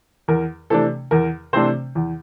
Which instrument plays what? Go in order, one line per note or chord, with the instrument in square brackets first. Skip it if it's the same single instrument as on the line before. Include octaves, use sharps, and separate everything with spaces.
[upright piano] E2 A#4
C3 E3 A3 D4 A4
E2 A#4
C3 E3 A3 C4 D4 C5
E2